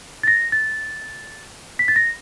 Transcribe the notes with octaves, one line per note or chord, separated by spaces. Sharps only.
A6
A#6
A6
B6
A6
A#6